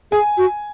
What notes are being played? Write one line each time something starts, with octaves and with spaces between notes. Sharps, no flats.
G#4 G#5
F#4